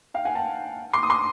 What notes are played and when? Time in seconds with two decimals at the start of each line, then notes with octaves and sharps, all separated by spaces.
0.14 F5 G5
0.25 F#5 G#5
0.35 G5 A5
0.93 C6 D6
1.03 D#6
1.10 C6 D6